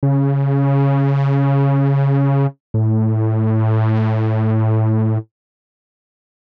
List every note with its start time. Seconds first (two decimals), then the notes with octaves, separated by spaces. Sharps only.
0.03 C#3
2.74 A2